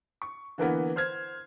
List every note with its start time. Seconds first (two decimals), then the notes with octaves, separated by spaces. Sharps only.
0.22 C#6
0.58 D3 E3 A#3 B3
0.96 C5 F6 G#6